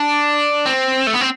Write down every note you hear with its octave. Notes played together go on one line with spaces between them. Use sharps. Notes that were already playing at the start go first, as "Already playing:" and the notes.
Already playing: D4
C4
A3
B3
C4